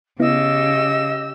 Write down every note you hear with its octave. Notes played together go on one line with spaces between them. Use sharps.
C#3 B3 E4 G4 D#5 E6